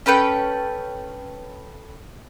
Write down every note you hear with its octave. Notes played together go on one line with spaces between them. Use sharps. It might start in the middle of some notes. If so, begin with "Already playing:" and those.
C#4 A4 B4 G5